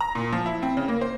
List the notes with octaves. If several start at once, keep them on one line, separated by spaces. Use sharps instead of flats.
A#5
A#2
F3
E4
C4
C#3
A#3
C5